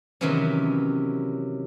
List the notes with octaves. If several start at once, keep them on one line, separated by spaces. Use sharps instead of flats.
C3 D#3 E3 F#3 B3 C#4